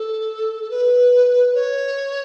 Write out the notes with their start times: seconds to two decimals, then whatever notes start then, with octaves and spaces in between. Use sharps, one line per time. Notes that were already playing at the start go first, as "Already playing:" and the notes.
Already playing: A4
0.63 A4
0.71 B4
1.55 C#5